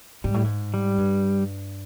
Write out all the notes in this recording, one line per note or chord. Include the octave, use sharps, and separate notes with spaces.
G#2 G3
A2
G#2
G3
G2